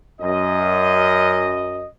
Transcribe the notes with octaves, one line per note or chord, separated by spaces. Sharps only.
F#2 D#5